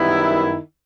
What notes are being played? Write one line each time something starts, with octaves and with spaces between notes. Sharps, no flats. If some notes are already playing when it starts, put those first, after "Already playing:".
Already playing: F#2 D#3 G3 B3 E4